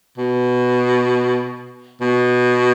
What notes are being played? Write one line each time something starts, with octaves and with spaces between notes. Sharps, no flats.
B2
B2